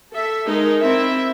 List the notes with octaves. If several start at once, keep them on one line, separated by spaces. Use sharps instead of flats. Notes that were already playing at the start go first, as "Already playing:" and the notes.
A4 E5
G#3 D#4 A#4
C4 E4 E5